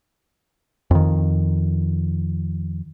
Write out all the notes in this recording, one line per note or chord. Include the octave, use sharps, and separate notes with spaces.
F2 D#3